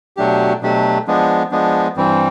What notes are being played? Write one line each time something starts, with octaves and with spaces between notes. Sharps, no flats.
B2 F#3 A3 D4 G4
B2 F#3 A3 D4 G4
F3 G#3 B3 D4
F3 G#3 B3 D4
G2 E3 G3 C4